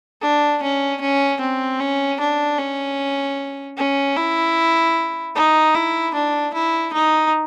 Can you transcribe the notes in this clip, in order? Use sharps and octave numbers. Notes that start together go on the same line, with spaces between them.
D4
C#4
C#4
C4
C#4
D4
C#4
C#4
E4
D#4
E4
D4
E4
D#4